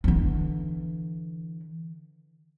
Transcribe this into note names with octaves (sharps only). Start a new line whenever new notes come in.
D3 E3